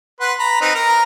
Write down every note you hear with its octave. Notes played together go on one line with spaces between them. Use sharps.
B4 F#5 C6
A#5 B5
C4 D#4 B4
A#4 A#5